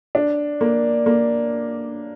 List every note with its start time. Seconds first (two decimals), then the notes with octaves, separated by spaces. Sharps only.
0.15 D4
0.61 A#3
1.06 A#3